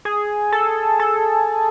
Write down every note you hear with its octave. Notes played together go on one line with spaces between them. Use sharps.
G#4
A4
A4